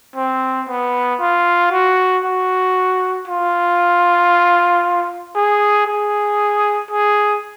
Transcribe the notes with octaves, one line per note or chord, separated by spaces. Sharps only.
C4
B3
F4
F#4
F#4
F4
G#4
G#4
G#4